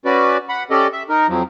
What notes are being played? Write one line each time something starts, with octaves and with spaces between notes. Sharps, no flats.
C#4 F#4 B4 D5
F#5 B5
C#4 G4 A4 D5 D#5
E5
D#4 A#4
F2 F3 F#3